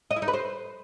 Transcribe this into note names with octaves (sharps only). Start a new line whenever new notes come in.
D#5
E4
D#4
B4
C5